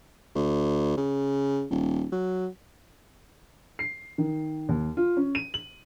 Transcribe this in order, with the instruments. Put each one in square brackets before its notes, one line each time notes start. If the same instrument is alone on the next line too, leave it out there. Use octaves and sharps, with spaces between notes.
[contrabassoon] D2
C#3
D#1
F#3
[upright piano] C7
D#3
D#2
F4
C#4
D#7
F#7